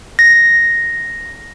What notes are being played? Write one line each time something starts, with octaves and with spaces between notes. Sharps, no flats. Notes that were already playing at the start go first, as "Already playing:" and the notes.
A#6